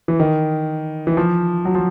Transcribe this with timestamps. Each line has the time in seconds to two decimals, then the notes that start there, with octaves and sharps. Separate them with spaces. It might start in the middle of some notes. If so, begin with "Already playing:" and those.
0.08 E3
0.20 D#3
1.07 E3
1.17 F3
1.65 F#3
1.75 F3